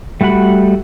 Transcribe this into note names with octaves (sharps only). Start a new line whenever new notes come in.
G3 A3 F#4 F#5 B5